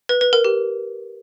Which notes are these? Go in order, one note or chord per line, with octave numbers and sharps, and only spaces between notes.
B4
B4
A#4
G4